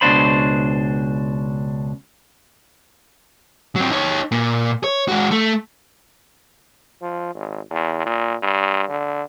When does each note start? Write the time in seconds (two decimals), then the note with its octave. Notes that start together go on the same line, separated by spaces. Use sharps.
0.01 C#2 B2 D4 C5 B5
3.76 F#3 C4
3.91 D#4 C#5
4.32 A#2
4.84 C#5
5.08 G#3 F#4
5.31 A3
7.02 F3
7.35 G#1
7.71 E2
8.06 A#2
8.43 G2
8.89 D3